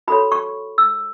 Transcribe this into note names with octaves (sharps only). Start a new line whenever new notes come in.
F#4 A4 C#5 B5
C#6
E6